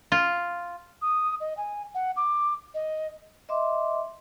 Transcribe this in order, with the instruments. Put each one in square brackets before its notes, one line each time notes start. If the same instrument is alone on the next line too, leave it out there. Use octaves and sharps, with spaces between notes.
[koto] F4
[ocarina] D#6
D#5
G#5
F#5
D6
D#5
[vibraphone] D#5 E5 C6 D6